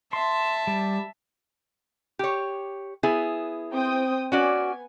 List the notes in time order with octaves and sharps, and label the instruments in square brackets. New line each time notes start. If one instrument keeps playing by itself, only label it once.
[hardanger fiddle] E5 A5 [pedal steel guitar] C6
[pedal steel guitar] G3
[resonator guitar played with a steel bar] G4 C#5
B3 E4 G#4
[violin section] C4 G5 D#6
[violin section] B3 G#5 [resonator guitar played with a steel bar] C#4 F#4 D5